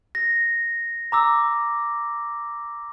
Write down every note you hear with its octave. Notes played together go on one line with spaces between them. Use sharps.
A#6
A#5 D6 E6